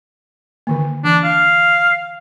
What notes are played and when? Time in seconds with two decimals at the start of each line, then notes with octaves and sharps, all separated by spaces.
0.67 D3 D#3 A#3
1.04 E3 D4
1.24 F5